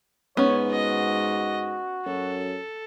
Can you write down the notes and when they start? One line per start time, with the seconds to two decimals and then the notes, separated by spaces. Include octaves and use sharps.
0.37 G#2 B3 C#4 C#5
0.72 F#4 D#5
2.06 F#2 A4